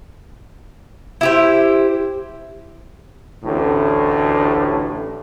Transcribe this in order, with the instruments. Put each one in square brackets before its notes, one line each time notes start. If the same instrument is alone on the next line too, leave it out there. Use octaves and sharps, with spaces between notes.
[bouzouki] E4 G4 C5
[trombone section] A1 D2 A2